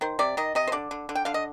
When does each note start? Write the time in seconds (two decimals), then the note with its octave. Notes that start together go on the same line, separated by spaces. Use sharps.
0.01 D#3 C5
0.19 C3 D5
0.37 D#3 D#5
0.55 C3 D#5
0.67 C5
0.72 D3 D5
0.91 D3
1.09 D3
1.15 G5
1.25 D3 F5
1.34 D#5